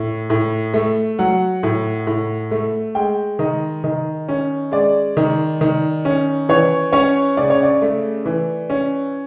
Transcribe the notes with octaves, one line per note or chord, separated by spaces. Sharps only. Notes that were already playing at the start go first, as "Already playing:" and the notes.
Already playing: A2
A2
A3
F#3 F#5
A2
A2
A3
G#3 G5
D#3 D#5
D#3
C#4
G#3 D5
D#3
D#3
C#4
E3 C#5
C#4 C#5
C#3 D5
C#5
D5
A3
E3
C#4